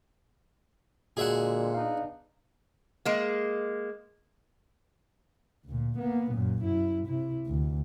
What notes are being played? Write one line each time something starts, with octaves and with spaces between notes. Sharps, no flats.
A#2 D3 G#3 F#4 G#4 E5 F#5
B3 D4 D#4 F5
G#3 A#3
D2 A#2
A#3 B3
F#2 A#2
F#2 E4
C3 E4
D2